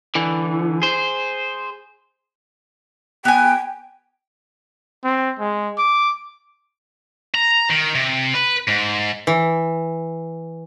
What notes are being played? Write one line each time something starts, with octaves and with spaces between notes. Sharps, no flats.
D3 E3
G#4 C5
B3 G5 G#5
C4
G#3
D6
A#5
D#3
C3
B4
G#2
E3